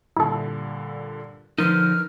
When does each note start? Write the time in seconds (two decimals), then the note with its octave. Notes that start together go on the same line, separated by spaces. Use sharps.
0.17 G2 A#2 D3 E4 A4
1.58 D3 F3 D#4 A#4 B4 F6